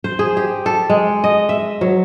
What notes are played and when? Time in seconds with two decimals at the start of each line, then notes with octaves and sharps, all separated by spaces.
0.04 C5
0.19 G#4
0.37 G4
0.66 A4
0.89 G#3
1.24 D#5
1.49 E5
1.81 F#3